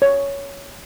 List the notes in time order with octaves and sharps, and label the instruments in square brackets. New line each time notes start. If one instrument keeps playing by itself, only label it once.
[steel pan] C#5